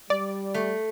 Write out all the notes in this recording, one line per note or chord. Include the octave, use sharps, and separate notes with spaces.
G3 D5
A3